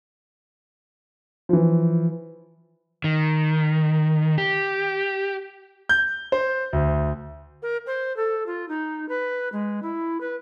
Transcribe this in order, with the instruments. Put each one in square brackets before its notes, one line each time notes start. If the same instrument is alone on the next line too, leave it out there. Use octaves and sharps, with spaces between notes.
[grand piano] E3 F3
[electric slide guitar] D#3
G4
[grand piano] G6
C5
D2
[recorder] A#4
C5
A4
F4
D#4
B4
G#3
E4
B4